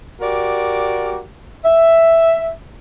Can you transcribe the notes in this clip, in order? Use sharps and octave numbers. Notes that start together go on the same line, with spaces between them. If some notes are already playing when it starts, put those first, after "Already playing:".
F#4 G4 A#4 D5
E5